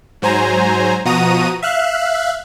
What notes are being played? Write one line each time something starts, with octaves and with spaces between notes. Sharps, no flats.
G#2 F#3 C5 G#5 A#5
B2 F3 F#4 A#5 D#6 D#7
E5 F5 F#6